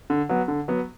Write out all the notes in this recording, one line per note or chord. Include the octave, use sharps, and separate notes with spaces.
D3
F#3 B3
D3
F#3 B3